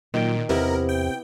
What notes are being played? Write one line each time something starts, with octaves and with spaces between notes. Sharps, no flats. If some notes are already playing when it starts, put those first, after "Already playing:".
A#2 D#3 F#3 G5
E2 C3 B3 E4 G4 A#4
G5